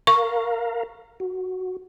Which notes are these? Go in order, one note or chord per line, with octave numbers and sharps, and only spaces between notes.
A#4 F5 A#5 C#6
F#4